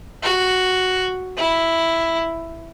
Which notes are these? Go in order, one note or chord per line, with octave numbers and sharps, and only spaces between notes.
F#4
E4